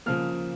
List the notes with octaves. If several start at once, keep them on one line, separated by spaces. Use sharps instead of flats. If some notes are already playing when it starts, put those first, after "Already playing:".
C#3 F3 A#3 F6